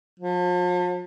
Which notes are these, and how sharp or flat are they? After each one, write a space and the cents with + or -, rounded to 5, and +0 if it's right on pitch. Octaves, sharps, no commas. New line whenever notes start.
F3 +40